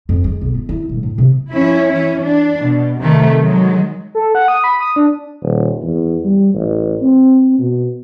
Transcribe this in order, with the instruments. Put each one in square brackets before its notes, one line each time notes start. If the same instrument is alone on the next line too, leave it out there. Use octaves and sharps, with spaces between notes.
[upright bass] F2
G#3
B1
F4
E4
D#1
A2
C3
[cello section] F3 C#4 E4
E3 C#4
D4
B2
C3 D#3 A3
D#3 F#3 G#3
[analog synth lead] A4
F#5
D#6
B5
D#6
D4
[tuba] D#1
E2
G3
A1
C4
B2